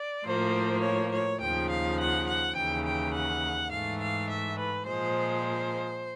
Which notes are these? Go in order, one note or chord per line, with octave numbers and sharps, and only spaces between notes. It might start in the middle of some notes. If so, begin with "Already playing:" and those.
Already playing: D5
A2 F3 A#3 C5
C#5
C#5
D#2 C#3 F3 G5
F5
F#5
F#5
D#2 C#3 E3 G5
G5
F#5
G#2 E3 A3 F5
F5
E5
B4
A#2 F3 G#3 C5